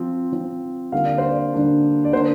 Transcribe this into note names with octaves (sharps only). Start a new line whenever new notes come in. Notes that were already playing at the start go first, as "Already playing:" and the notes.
Already playing: F3 C4
F3 C4
D3 G3 A#3 D4 F5
D5
C5
D5
D3 G3 A#3 D4
D5
D3 A#3 D4 C5